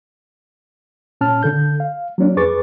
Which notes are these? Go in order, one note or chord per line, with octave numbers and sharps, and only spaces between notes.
A#2 C#4 A5 F6
D3 A4 G6
F5
F#3 A#3 C#4 D4
F2 G#4 B4 C#6 D6 A6